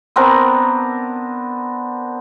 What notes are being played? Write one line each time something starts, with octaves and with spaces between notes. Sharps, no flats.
B3 C4 D4 A#4